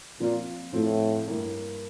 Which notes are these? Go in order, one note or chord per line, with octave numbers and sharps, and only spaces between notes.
A#2 F3 C4 F4
A2 F3 C4 F4
G2 E3 A#3 E4